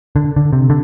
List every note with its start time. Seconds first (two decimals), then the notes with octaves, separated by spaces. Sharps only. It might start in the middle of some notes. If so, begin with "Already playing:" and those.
0.16 D3
0.36 D3
0.53 C3
0.70 D3